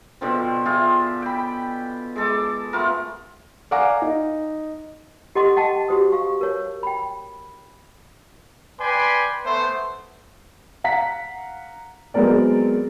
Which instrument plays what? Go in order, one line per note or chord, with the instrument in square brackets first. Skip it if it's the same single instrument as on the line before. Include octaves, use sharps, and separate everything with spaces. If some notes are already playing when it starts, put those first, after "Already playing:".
[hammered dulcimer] B2 D3 F3 C4
F4 G4 G#4 E5
G5 B5
G#3 A4 D6
A3 B3 F4 A#4
[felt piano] D5 F5 F#5 G#5 A#5 D6
D#4
[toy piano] G4 A4 D#5 F#5 C6 D6
D#5 F#5 G5 A5
F#4 G4 C5 D#6
F5 C#6
A#4 C#5
G5 B5
[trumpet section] B4 D5 G5 G#5 B5 C6
A3 B3 C5
[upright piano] F5 F#5 A#5 B6
F#3 G#3 B3 C4 A#4 D5